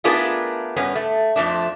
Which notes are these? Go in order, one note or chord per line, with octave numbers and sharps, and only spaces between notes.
A3 B3 D4 F4 G#4 A#4
G2 B3 C#4
A3
F2 F3 A3 D4